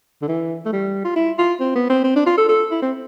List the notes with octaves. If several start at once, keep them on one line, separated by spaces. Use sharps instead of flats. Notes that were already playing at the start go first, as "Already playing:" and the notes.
D3
E3
A3
G3
F4
E4
F4
C4
B3
C4
C4
D4
F4
A4
A4
E4
C4